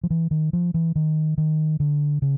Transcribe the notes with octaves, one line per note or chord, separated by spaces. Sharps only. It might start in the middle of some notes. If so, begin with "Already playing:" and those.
F3
E3
D#3
F3
E3
D#3
D#3
D3
C#3